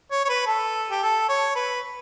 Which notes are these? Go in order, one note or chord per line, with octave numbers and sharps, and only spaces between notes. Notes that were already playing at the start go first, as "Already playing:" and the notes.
C#5
C#5
B4
A4
G4
A4
C#5
B4